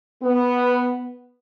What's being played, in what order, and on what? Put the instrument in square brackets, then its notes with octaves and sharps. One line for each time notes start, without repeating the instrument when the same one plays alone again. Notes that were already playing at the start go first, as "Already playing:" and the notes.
[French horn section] B3